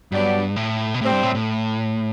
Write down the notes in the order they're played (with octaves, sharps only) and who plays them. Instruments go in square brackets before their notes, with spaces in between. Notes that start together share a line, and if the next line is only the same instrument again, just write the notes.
[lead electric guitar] G2 [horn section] F#3 B3 D4 G4 D5
[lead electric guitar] A2
B2
[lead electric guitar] A2 [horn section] C3 G3 C4
[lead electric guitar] G2
A2
A2